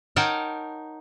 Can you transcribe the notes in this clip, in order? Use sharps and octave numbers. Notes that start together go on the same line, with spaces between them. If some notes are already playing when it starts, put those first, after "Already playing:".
D#4 A#4 C#5 F#5 G5 A5